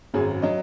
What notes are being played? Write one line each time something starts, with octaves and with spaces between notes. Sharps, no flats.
G#1 F#2 F#3 G#4
F#3 D#5